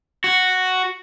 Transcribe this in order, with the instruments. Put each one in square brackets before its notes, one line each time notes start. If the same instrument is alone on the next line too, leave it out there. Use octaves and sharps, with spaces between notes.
[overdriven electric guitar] F#4